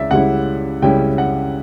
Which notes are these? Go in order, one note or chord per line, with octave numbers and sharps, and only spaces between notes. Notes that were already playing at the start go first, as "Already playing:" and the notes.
Already playing: C#2 C#3 C#4 E4 D5 E5
C#2 C#3 G3 C#4 E4 F#5
C#2 C#3 G3 C#4 E4 G5
F#5